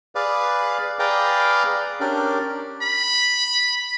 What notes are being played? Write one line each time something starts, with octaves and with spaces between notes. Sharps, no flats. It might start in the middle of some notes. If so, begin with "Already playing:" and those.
G#4 B4 D5 F5
G#4 B4 D5 F5 G5 A#5
C#4 D4 G4 A#4 D5
B5